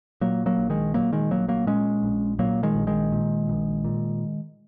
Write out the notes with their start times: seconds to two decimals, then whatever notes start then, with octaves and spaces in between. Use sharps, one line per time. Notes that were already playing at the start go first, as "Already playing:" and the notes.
0.21 A#2 F#3 A#3
0.46 F#3 A#3
0.58 A#1
0.70 D#3 G#3
0.94 A#2 F#3 A#3
1.13 D#3 G#3
1.30 A#1 F#3 A#3
1.48 F#3 A#3
1.67 A#2 G#3 C#4
2.03 A#1
2.39 A#2 F#3 A#3
2.63 D#3 G#3
2.75 A#1
2.87 D#3 G#3
3.12 A#2
3.48 A#1
3.84 A#2